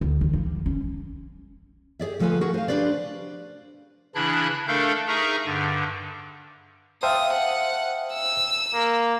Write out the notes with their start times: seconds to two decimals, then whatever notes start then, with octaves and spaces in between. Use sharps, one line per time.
0.01 D2
0.21 D#3
0.33 F3
0.46 G3
0.66 C#4
1.99 G4 G#4 D5 E5
2.19 D2 F3 A3 F4 B4 G#5
2.41 F#4 G#4 A#4
2.54 C5 F5
2.68 D4 G4 B4 C5 D5
4.15 C#3 E3 D4 E4 B5 F#6
4.68 A3 D4 A4 A#4 F5 G6
5.08 D#4 G#4 A#4 E5 A#5 C#6
5.45 G2 D3
7.03 C5 E5 F5 G5 A5 D#6 F6
7.34 F#5
8.13 E6
8.74 A#3